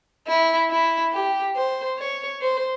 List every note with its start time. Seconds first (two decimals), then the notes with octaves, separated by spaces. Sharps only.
0.27 E4
0.71 E4
1.13 G4
1.56 C5
1.99 C#5
2.42 C5